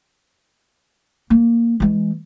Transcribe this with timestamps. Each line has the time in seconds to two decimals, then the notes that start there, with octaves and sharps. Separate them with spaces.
1.30 A#3
1.80 E3 G#3